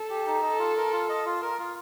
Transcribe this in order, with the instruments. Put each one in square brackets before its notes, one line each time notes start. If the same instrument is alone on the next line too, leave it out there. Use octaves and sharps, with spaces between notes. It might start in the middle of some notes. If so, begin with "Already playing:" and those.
Already playing: [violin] A4
[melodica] G4
D#4
[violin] A4 [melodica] D#5
[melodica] F4
A#4
F4
D#5
F4
A#4
F4